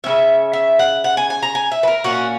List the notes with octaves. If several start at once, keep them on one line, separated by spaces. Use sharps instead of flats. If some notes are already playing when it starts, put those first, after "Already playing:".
C#3 G#3 C#4 E5
E5
F#5
F#5
G#5
G#5
A#5
G#5
E5
B4
A#4
A#2 A#3 C#4 F#4